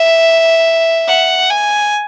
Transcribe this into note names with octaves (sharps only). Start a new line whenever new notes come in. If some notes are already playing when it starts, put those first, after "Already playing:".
Already playing: E5
F#5
G#5